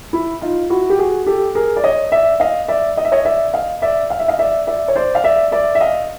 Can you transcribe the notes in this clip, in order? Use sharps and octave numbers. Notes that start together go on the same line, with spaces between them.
E4
D#4 F4
E4 F#4
G4
F#4 G#4
G4 A4
G#4 A#4
D5
C#5 D#5
D5 E5
D#5 F5
D5 E5
D#5
E5
C#5 D#5
D5 E5
D#5 F5
D5 E5
F5
E5
D#5 F5
D5 E5
D5 E5
C#5
C5 D5
F5
D5 E5
D5 E5
E5
D#5 F5